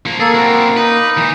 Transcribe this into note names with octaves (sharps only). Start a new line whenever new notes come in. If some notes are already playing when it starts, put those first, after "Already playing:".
F3 A#3
A#3 G#4 A4
C4 E4 F#4
D#4 B4
E3